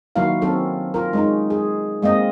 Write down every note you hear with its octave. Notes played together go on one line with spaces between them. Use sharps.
D#3 F#3 A#3 E4 F#4 F5
F#3 C4 C#4 A4
F4 A#4
G#3 C#4 D#4
G#4
G#3 A#3 C4 D#5